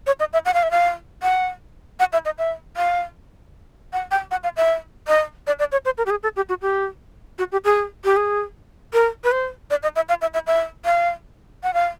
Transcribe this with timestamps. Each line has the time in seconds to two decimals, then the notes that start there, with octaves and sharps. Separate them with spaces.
0.07 C#5
0.20 D#5
0.33 E5
0.45 F#5
0.54 F5
0.63 E5
0.71 F5
1.23 F#5
1.99 F#5
2.13 E5
2.25 D#5
2.38 E5
2.76 F5
3.93 F#5
4.11 G5
4.31 F#5
4.43 F5
4.57 E5
5.08 D#5
5.47 D5
5.59 D5
5.72 C#5
5.85 C5
5.98 A#4
6.06 G4
6.10 G#4
6.23 A4
6.36 G4
6.49 F#4
6.62 G4
7.38 F#4
7.52 G4
7.65 G#4
8.04 G4
8.16 G#4
8.93 A#4
9.24 B4
9.32 C5
9.70 D5
9.83 D#5
9.96 E5
10.09 F5
10.21 E5
10.34 E5
10.47 E5
10.85 F5
11.63 F#5
11.74 F5